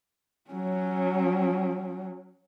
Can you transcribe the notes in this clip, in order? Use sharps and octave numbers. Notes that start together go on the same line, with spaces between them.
F#3 C#4